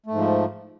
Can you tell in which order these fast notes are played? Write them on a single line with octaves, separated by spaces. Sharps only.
A3 G#2 F3